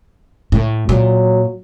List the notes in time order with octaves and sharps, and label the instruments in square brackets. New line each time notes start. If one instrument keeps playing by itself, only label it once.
[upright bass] A2
[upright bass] A#2 [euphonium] F#3